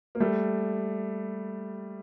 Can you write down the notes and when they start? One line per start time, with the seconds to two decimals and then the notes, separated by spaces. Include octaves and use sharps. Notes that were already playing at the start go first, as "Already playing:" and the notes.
0.15 A#3
0.20 G3 A3